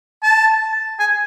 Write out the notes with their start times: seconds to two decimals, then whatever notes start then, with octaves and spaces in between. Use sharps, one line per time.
0.23 A5
0.99 G#5